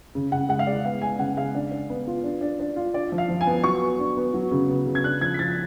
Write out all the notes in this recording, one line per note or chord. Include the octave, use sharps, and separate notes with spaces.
C#3
C#3 F#5
G#3 F#5
F5
G#3 D5
B3 F5
G#3 G#5
C#3 F#5
G#3 F5
D4
D4
B3
F4
D4
D4
D4
F4
D4 D5
F3
F5
F3
G#5
B3
F#3 C#6
B3
D4
B3
F#3
C#3
B3
C#3
G#6
D4 F#6
F3 G#6
B6
F3 A6